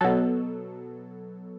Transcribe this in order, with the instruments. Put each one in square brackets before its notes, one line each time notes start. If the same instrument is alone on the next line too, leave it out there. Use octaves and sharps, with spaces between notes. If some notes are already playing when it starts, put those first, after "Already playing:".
[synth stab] B2 F#3 A4